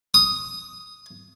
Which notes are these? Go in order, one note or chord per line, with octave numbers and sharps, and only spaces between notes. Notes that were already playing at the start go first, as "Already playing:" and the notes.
D#6